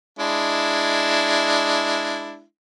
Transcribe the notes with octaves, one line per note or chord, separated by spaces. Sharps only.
G#3 D4 E4